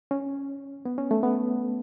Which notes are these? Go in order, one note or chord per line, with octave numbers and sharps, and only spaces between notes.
C#4
B3
C#4
A3
B3